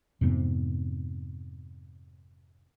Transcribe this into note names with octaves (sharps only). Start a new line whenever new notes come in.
F2 G#2 C3 B3